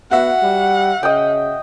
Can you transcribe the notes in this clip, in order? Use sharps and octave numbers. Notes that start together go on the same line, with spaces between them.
B3 F#4 E5 F#5
G3
C#3 D#5 G5